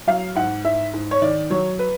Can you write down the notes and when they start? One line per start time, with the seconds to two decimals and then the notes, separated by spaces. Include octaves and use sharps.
0.07 F#3 F5
0.36 G#2 F#5
0.65 G#2 E5
0.94 G#2
1.11 C#5
1.22 D#3 D5
1.50 F#3 C#5
1.79 B4